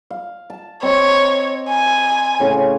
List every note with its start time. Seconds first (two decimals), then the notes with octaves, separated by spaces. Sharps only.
0.10 F5
0.50 A5
0.83 C4 C#5 D#5
1.69 G#5
2.40 A2 C#3 C#4